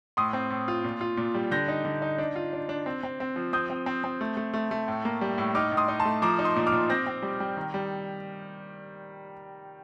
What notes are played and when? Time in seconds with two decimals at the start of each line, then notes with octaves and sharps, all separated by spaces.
0.17 A2 C6 D#6
0.33 C4
0.50 A2
0.68 F4
0.84 A#2
1.01 F4
1.17 A#2
1.34 G3
1.51 D3 G6 A#6
1.68 D#4
1.85 D3
2.02 D#4
2.18 D4
2.36 F4
2.53 D4
2.69 D4
2.86 C4
3.03 C4
3.20 C4
3.36 F3
3.53 C4 D#6 G6
3.70 C4
3.86 C4
4.04 C4
4.21 A3
4.37 A3
4.54 A3
4.71 A3
4.88 A2
5.05 A#3
5.21 G3
5.38 A2
5.55 D#4 D6 F6
5.72 A2
5.77 C6 D#6
5.88 D#4
6.00 A5 C6
6.05 A3
6.22 F3 A#5 D6
6.39 D#4
6.44 C6 D#6
6.56 A#2
6.67 D6 F6
6.72 A#2
6.90 C4 G6 A#6
7.07 C4
7.22 G3
7.40 G3
7.57 D#3
7.74 G3